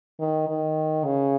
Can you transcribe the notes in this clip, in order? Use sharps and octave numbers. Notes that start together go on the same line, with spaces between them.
D#3
D#3
C#3